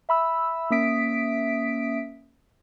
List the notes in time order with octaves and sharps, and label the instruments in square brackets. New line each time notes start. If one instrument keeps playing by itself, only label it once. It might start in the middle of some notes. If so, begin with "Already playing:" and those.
[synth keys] E5 B5 E6
A#3 C#4 E5 D#6 B6 D7